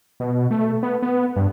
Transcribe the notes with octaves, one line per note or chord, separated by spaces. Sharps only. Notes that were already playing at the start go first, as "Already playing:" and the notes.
B2
A3
B3
B3
G2